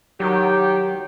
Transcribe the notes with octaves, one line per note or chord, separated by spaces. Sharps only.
D#3 F#3 G4